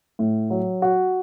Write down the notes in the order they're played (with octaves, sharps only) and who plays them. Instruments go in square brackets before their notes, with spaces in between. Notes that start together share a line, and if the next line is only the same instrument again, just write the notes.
[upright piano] A2
F#3
F#4